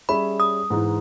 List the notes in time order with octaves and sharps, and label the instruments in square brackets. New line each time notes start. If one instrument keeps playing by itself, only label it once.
[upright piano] G3 C#4 G#4 C#5 E5 [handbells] B5
[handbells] D#6
[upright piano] G#2 E3 G#3 D#4